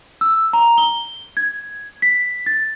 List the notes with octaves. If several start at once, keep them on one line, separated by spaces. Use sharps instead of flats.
E6
A#5
G7
G#6
B6
A6